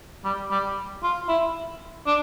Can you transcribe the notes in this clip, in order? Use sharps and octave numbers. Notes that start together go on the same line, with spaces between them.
G3
G3
F4
E4
D4